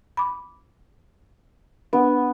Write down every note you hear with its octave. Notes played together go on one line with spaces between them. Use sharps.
B5 D6
B3 D4